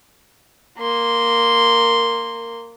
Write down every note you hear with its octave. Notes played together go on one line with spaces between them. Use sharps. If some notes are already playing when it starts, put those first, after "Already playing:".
A#3 C6